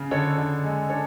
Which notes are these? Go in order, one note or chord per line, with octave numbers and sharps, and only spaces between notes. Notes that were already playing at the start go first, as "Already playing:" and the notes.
Already playing: C#3
D3 A4 C#5
D3
G#3
D4 A4 C#5